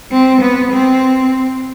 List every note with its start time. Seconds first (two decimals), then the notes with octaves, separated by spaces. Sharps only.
0.11 C4
0.41 B3
0.71 C4